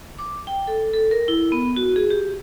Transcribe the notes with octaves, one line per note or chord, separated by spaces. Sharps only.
D6
G5
A4
A4
A#4
E4
B3
F#4
G#4
G4